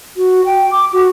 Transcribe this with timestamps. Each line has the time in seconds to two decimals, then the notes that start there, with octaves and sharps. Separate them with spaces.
0.17 F#4
0.45 G5
0.71 D6
0.93 F#4